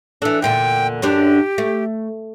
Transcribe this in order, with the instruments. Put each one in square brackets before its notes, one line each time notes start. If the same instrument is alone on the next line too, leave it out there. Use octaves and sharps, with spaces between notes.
[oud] E3 D4 [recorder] A4
[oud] E2 A#2 D3 [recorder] G5
[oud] F#2 D3 D4 [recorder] G4
[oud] A3